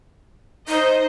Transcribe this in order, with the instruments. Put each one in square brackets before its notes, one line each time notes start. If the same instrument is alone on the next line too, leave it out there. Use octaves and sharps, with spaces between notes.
[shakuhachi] D#4 [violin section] C5 D#5